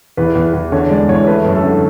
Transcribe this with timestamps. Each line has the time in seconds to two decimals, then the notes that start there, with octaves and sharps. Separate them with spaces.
0.17 E2 B4
0.35 E2
0.53 E2
0.72 D3 C#5
0.90 G#3 D5
1.09 E2 C#5
1.27 A3 B4
1.45 F#2
1.55 A4
1.64 D3